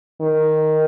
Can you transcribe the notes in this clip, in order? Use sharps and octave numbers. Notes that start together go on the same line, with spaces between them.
D#3